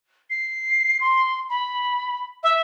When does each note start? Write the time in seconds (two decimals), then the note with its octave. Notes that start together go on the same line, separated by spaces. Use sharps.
0.30 C7
1.01 C6
1.50 B5
2.43 E5